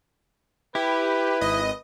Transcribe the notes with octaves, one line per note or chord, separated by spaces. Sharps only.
E4 G4 B4
G#1 D#5